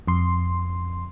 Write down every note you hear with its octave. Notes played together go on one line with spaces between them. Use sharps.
F2 C6